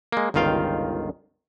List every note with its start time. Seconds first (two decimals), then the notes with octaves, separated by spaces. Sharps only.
0.12 G#3 A#3
0.34 G1 C#2 D#3 F4 F5 G5